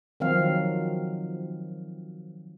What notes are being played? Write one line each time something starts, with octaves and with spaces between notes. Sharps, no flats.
D#3 F3 F#3 C4 F5